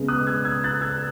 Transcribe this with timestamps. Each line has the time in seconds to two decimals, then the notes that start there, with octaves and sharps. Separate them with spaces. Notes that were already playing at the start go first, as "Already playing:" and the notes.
Already playing: C#3 G#3 B3
0.08 D#6 F#6
0.27 E6 G#6
0.45 E6 G#6
0.64 F#6 A6
0.81 E6 G#6